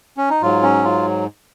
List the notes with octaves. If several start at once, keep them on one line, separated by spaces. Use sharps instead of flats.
C#4
D#4
G#2 F#3 F4
C#4
F4